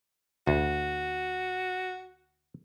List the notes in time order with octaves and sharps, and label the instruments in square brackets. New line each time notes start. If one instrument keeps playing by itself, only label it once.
[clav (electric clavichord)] D2 [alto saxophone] F#4